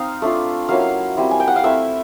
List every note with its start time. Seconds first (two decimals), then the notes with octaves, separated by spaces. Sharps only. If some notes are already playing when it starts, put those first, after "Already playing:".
Already playing: C4 D#4 F5
0.22 A3 D4 F4
0.69 F#3 A#3 C#4 E4 F5
1.17 G3 C4 E4
1.31 G#5
1.40 G5
1.48 F#5
1.56 F5
1.64 A3 C4 E4 E5